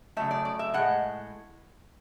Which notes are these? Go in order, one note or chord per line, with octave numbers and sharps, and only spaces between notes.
C#3 F#3 A3 E5
D5
D5
E5
A2 G#3 F#5